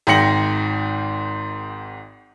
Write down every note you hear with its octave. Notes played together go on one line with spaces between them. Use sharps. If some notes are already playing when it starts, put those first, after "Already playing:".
G#1 G#2 G5 A#6 C#7 F#7